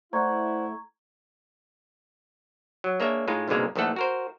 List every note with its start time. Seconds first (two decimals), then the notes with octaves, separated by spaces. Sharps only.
0.13 A3 E4 C5 D5 F#5 A#5 C#6 G#6
2.84 F#3
3.00 G#3 A#3 D4 C#5 E5
3.28 A2 G#3 D#4 F4
3.48 C2 G#2 B2 D3 G#3 A#3
3.76 A#1 D#3 E3 A3 A4 F#5
3.96 F#4 A#4 C5